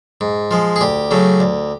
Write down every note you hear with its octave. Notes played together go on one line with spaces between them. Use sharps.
G#2
F3 G#3
G#4
D2 G4
C#3 F#3 A3
D2